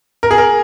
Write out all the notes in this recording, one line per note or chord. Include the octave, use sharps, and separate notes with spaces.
A#4
G#4
A#4